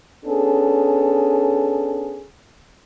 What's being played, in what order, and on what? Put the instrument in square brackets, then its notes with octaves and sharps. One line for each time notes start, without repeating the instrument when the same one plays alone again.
[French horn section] B3 C#4 D4 G#4 A4